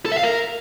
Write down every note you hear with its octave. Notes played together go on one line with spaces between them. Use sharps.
A4
E5
F5
A#4